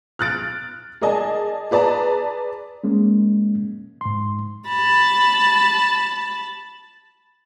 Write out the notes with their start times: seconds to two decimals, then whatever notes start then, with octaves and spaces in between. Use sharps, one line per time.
0.19 F6 F#6 A6 D7
1.01 G#4 A#4 D5 D#5 G#5 A5
1.71 G#4 B4 D5 A5 A#5
2.84 G#3 A#3 C#4
4.01 G#2 C6
4.68 A5 B5